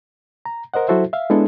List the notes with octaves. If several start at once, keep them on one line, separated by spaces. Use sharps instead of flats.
A#5
A#4 C5 D#5 F#5
F#3 E4 F#4 A4 C5 E5
E5 F5
G#3 B3 D4 E4 A4